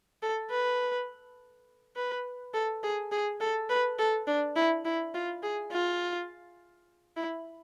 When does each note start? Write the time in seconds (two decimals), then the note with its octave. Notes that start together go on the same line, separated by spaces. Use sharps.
0.23 A4
0.51 B4
1.96 B4
2.54 A4
2.83 G#4
3.12 G#4
3.41 A4
3.70 B4
3.99 A4
4.27 D4
4.56 E4
4.85 E4
5.15 F4
5.43 G#4
5.72 F4
7.17 E4